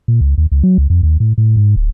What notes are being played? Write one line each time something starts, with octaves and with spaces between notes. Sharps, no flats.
A#2
C#2
D#2
C#2
F#3
C#2
F2
D#2
A2
A2
G#2
D1